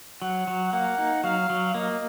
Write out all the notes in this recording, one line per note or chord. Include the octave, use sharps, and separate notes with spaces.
F#3 F#5
F#3
A#3 F#5
D#4
F#3 F5
F#3
A#3 D#5